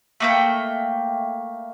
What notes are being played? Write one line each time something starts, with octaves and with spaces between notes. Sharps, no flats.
A3 A#3 G5